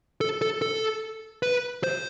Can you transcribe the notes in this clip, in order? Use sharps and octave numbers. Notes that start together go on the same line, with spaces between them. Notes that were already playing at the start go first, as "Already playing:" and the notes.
A4
A4
A4
B4
C5